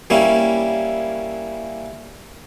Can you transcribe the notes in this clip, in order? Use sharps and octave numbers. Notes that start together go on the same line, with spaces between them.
G3 A#3 C#4 E4